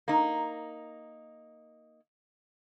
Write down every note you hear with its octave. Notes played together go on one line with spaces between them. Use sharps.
A#3 D#4